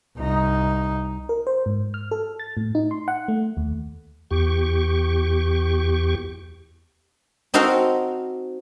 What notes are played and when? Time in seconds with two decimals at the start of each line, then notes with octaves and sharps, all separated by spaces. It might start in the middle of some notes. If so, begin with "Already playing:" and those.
0.17 C2 D#4
1.29 A#4
1.47 C5
1.66 G#2
1.94 F6
2.11 A4
2.40 A6
2.57 A2
2.75 D#4
2.91 C6
3.08 F#5
3.28 A3
3.57 D#2
4.31 E2 G4 C#6
7.54 C4 D#4 F#4 A4 A#4 F5